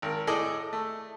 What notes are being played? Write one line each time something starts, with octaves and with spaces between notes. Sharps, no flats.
G#1 A#4
A2 G#4 A4 D5 D#5
A3